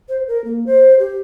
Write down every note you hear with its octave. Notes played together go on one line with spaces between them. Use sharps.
C5
A#4
A#3
C5
G4